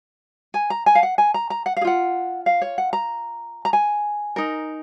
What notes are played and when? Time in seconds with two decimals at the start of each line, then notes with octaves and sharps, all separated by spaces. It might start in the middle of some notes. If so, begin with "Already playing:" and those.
0.54 G#5
0.70 A#5
0.86 G#5
0.95 F5
1.03 F#5
1.18 G#5
1.34 A#5
1.50 A#5
1.66 F#5
1.77 G#4 F5
1.85 F4 F#5
2.46 F5
2.62 C#5
2.78 F#5
2.93 A#5
3.65 A#5
3.73 G#5
4.36 D#4 A#4